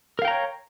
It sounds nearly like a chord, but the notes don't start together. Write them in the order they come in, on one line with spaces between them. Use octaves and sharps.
A#4 F5 G5 A#5 C#5